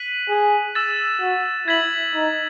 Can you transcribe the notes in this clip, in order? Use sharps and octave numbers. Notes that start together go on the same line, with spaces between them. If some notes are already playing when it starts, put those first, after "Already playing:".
Already playing: F#6 B6 D#7 F#7
G#4
E6 A6 E7
F#4
E4 G#6 B6 F#7
D#4